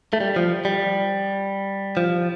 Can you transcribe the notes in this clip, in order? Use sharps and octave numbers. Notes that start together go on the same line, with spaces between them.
A3
G3
F3
G3
F3